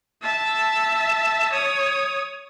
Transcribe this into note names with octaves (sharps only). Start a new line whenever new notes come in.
E5 A5
C#5 D#6